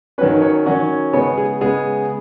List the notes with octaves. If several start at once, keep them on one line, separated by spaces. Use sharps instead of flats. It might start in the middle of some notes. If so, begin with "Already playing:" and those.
D#3 F#3 C#4 B4
C#5
D#3 F#3 C#4 F#5
C#3 G#3 B3 C#5
G#4
C#3 G#3 B3 G#4